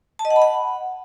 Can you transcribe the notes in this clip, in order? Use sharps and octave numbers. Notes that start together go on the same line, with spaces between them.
A5
D#5
F#5
B5
F#5